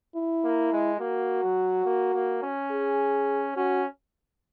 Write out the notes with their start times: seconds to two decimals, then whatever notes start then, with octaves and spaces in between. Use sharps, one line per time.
0.15 E4
0.44 A#3
0.73 G#3
1.00 A#3 F#4
1.44 F#3
1.85 A#3
2.14 A#3
2.43 C#4
2.71 G#4
3.56 C#4 F#4